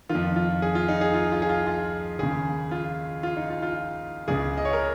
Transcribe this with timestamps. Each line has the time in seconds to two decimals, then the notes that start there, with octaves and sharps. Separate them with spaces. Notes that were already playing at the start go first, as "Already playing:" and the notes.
0.09 D#3 F4
0.15 F2
0.36 F4
0.62 G#4
0.75 F4
0.88 D#4
1.01 G#4
1.14 F4
1.32 F4
1.42 G#4
1.49 F4
1.67 F4
2.19 D#2 C#3 G#4
2.71 F4
3.23 F4
3.37 D#4
3.50 F4
3.62 F4
4.28 C#2 C#3 G#4
4.57 D#5
4.65 C#5
4.73 A#4